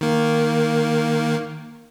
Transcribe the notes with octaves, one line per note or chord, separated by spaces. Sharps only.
D#3 A#3